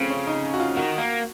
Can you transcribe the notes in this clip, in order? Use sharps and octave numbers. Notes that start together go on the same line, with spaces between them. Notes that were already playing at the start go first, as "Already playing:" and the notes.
Already playing: C#3 F3 A3 C4
C#4
D#4
F#4
F4
D#3 F#4
A#3